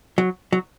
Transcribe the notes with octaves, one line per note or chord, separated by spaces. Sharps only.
F#3
F#3